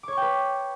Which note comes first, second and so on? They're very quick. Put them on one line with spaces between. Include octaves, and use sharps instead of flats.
D6 C#5 C#6 G5 B4